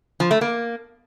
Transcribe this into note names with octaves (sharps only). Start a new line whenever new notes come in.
F3
A3
A#3